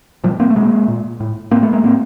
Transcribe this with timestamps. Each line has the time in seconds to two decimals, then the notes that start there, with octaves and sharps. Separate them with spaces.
0.24 A#2 F3 G3
0.40 A#3 C4
0.50 A3
0.56 B2 G#3 A#3
0.88 A#2
1.20 A2
1.51 A2 A#3 C4
1.63 A3 B3
1.73 G#3 A#3
1.83 A2 A#3 C4